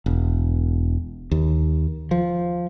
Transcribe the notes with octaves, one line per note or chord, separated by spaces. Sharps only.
E1
D#2
F3